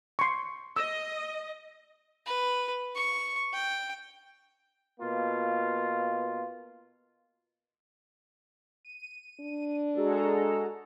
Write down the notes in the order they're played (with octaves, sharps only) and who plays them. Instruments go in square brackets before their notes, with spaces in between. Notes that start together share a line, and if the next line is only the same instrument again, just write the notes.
[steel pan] C6 C#6
[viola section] D#5 [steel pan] E6
[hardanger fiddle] B4
C#6
G5
[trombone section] B2 A#3 F4
[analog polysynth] D#7
[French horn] D4
[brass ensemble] G#3 A4 [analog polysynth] F#4 G#4 A#5